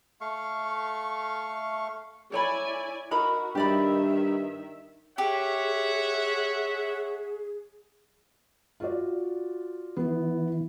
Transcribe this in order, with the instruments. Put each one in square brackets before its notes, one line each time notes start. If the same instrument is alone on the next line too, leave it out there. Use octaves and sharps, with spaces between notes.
[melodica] A3 F5 C#6
[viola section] E4 D5 G#5 [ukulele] A4 C#5 B5
[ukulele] D#4 A#4 B5 [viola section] F#4
[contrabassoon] G2 [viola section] D#3 E5 [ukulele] G4 D5 B5
[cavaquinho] G4 [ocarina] G#4 [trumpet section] C#5 E5 F#5
[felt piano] F4 F#4 D5
[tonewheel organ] E3 [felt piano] B3